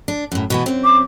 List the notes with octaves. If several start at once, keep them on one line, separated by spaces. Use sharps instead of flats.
D4
F#2 A2
B2 E3 B3
F#2 C4
D6